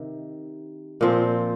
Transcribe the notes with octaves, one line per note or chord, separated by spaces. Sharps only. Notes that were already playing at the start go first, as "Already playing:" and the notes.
Already playing: C3 D#3
A#2 F3 C4